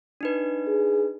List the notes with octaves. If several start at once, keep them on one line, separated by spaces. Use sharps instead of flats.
D4 D#4 B4
G#4